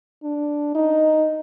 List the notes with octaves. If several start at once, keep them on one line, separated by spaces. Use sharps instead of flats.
D4
D#4